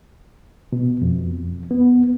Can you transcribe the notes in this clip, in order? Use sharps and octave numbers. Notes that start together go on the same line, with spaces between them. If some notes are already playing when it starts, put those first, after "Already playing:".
B2
F2
B3